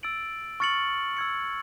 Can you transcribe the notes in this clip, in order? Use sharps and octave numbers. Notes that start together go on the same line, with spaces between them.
E6 A6 D7 F#7
C#6 F6 A6 C#7 F#7
E6 G#6 C#7